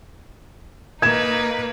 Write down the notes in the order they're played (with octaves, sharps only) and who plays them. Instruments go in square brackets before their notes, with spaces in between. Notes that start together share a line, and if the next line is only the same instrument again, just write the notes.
[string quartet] A#3 [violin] D#4 B4 [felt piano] G#6 E7